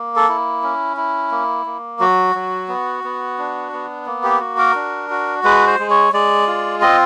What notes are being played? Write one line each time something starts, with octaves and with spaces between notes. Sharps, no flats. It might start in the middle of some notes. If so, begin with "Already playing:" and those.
Already playing: A#3
A4
E4
C#4
E4
A#3
A#3
F#3 F#4
F#3
B3
B3
D4
B3
A#3
G4
F#4
A#4
D4
F#4
G#3 B4
C5
G#3
C#5
G#3 D5
F4
C4 D#5